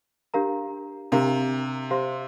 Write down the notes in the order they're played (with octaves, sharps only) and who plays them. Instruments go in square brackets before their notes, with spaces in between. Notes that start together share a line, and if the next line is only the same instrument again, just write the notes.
[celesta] D4 G4 A#4 F5 A#5
[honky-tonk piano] C3 [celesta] D4 G4 A#4 F5 A#5
[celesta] G4 C5 F5 C6